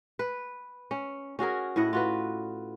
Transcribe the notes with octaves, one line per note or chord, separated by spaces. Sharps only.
B4
C#4
C#4 F#4 G#4 A#4
A2 E4 D#5 F#5
F4 F#4 B4